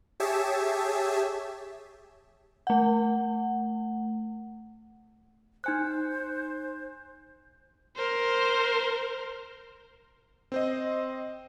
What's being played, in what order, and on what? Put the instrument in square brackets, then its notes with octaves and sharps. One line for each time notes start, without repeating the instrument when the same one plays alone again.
[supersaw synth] G4 G#4 C#5 E5 A5
[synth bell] A3 F#5
[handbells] D#4 G#5 F#6 [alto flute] C5
[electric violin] A#4 C5
[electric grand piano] C4 C5 D#5